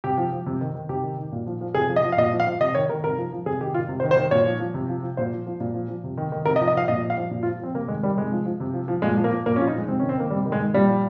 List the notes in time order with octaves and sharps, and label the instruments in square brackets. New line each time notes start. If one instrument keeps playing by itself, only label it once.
[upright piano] C3 G4
F3
F3
C3
D#3
D#3
C3 G4
D#3
D#3
A#2
F3
F3
C3 G#4
F3
D#5
F3
F5
A#2 D#5
F3
F5
F3
C3 D#5
D#3 C#5
D#3 A#4
C3 A#4
F3
F3
C3 G#4
D#3 G4
D#3 F4
C3
C5
D#3
C5
D#3
A#2 C#5
F3
F3
C3
F3
F3
A#2 C5
F3
F3
A#2
F3
F3
C3
D#3
D#3
C3 A#4
D#5
F3
D#5
F3 F5
A#2 D#5
F3
F5
F3
A#2
F4
F3
F3 C4
C3 A#3
D#3 G#3
D#3 G3
C3 G#3
F3
F3
C3
F3
F3
A#2 G#3
F3
A#3
F3
A#2 A#3
C#4
F3 F4
D#4
F3 G#3
C3 C4
D#3 C#4
C4
D#3 A#3
C3 G3
D#3
G#3
D#3
A#2 G3
F3